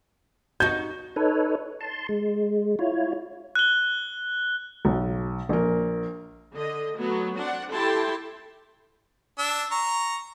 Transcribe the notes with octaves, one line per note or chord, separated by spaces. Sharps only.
D#4 F#4 G6
D#4 A4 B4 C#5
A5 C6
G#3
E4 F4 C#5
F#6 G7
B1
A#1 A#4
D3 D#5
F#3 A3 B3
C4 D4 F#5
E4 G4 A4 G5 A5 C6
D4 E6
A#5 C#6